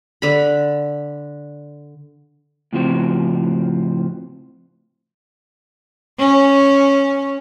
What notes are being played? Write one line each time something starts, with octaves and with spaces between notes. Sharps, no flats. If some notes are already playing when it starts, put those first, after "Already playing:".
D3 B5
A2 C#3 F3 C4 F#4
C#4